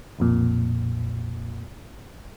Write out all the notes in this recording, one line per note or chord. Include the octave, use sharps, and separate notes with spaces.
B1 F2 A#2